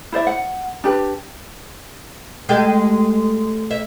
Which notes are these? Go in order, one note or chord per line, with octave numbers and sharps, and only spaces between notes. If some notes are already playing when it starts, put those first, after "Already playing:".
E4 C5 D5 E5
F#5
D4 G4 B4
G#3 A3 G4
E5